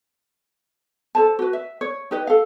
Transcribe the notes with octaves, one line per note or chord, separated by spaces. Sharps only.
A4 C5 A5
F#4 B4
E5
C#5
D#4 G4 B4 D#5
A4 F5